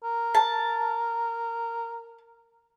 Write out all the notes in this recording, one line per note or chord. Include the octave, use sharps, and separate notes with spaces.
A#4
A5